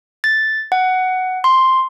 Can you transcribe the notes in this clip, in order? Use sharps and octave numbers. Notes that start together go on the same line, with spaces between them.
A6
F#5
C6